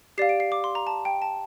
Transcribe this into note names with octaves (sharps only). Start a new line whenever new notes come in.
G4 D5 F5 C7
D7
C7
D6
C6
A#5
A5
G5
A5